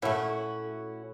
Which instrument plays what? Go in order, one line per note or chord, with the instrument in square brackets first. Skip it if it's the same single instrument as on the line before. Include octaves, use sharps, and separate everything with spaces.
[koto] A#2 A3 [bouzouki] C#4 E4 F#4